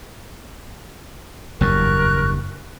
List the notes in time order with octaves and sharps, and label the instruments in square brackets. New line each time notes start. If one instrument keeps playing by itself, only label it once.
[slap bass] F#1 E2 G2 [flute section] A#4 C#6 F#6